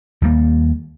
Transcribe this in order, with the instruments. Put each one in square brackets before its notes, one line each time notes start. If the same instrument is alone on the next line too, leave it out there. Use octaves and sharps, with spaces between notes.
[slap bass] D#2 G3 A#3